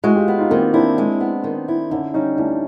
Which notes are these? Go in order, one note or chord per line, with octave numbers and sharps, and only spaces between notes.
G#3 E4 F#4
F4 G4
B3
D#4 F4
D#3 A#3 C4
C4 D4 E4
G#3
B3
D#3
E4
D3 C#4 D#4
G3 C#4 D#4
D2 D4 E4